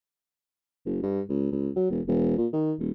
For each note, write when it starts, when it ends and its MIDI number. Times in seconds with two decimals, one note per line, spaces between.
0.86 0.98 30
1.03 1.21 43
1.29 1.51 37
1.52 1.70 37
1.76 1.88 54
1.90 2.01 28
2.07 2.36 28
2.38 2.47 46
2.53 2.73 51
2.79 2.90 27